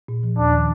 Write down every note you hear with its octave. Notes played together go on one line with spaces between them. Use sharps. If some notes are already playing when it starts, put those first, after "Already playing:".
A#2
F3
D#2 D4
D#3